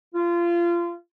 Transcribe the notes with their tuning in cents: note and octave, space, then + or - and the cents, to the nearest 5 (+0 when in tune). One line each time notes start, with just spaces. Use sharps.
F4 -25